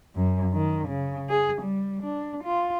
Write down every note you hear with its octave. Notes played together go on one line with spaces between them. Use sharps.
F#2
D#3
C#3
G#4
G3
D4
F4